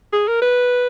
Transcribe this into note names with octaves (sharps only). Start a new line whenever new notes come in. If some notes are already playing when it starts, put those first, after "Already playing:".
G#4
A#4
B4